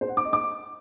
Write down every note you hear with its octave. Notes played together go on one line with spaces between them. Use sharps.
C5
F#5
D6
D#5
D6